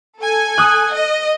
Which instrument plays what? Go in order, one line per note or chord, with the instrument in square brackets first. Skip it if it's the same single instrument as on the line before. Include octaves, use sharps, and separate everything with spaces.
[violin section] A4 G#5
[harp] D#6 F#6
[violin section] D#5